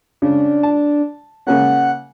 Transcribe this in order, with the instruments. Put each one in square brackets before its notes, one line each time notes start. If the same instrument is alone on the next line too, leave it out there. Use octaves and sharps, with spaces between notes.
[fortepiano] C#3 C#4 [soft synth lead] D4
[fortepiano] A5
[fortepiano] C#3 A#3 C#4 [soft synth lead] F#5